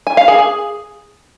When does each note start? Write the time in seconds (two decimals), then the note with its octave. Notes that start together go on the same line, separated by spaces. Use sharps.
0.07 G#5
0.17 F5
0.28 G#4
0.39 G#4